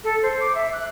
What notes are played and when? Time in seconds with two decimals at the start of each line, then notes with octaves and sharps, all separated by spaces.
0.04 A4
0.22 C5
0.40 D6
0.55 E5
0.73 F#6